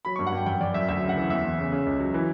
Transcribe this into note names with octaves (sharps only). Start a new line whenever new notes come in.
F#3 B5
C#6
G2
F#5
G2 G5
F#2 G5
F#2 D5
F#2 E5
D2 E5
C#3
F#5
E3
E2 E5
E2
C#3
C#3
C#2
F#3
E3